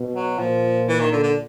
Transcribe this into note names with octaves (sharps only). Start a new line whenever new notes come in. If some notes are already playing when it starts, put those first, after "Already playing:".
Already playing: B2
F#3
A#2 F3
E3
D#3
D3
D3